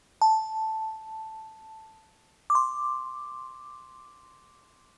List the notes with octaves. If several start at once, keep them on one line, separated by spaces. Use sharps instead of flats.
A5
D6
C6